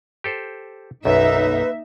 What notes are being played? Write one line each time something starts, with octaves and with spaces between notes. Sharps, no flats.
G4 A4 C5
B1 F#2 A#3 D#4 B4 E5